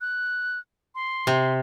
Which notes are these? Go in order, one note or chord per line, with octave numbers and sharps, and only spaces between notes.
F#6
C6
C3